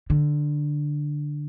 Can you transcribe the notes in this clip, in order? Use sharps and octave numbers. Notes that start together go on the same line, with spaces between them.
D3